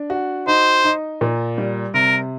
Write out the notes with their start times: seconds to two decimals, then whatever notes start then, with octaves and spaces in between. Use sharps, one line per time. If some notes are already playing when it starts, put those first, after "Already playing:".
Already playing: D4
0.10 F#4
0.47 D#4 C5
0.84 D#4
1.21 A#2
1.58 G3
1.94 C3 A#4